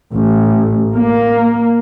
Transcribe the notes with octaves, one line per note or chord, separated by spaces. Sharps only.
A1
A#3